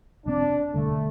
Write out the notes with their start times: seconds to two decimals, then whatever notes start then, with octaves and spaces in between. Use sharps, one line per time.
0.25 E1 E2 E3 C4 D4
0.74 E1 D2 D3 G3 A3